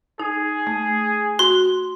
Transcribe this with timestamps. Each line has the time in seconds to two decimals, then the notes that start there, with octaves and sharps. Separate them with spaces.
0.20 D#4 G#4
0.67 A3
1.39 F#4 C6